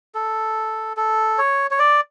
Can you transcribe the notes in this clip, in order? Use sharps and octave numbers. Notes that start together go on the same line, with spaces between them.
A4
A4
C#5
C#5
D5